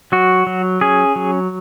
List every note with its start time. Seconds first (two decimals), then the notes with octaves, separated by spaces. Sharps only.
0.12 F#3 F#4
0.47 F#3
0.81 C#4 G#4
1.16 F#3